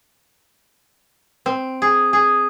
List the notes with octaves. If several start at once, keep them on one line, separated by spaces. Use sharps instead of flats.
C4
G#4
G#4